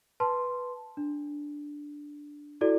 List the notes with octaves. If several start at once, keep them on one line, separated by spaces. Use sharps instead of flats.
B4 A5 C6
D4
E4 F#4 A4 D5